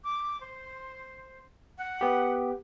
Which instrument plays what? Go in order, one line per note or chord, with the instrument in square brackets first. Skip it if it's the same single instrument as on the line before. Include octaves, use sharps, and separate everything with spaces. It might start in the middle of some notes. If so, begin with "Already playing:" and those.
[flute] D6
C5
F#5
[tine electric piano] B3 G4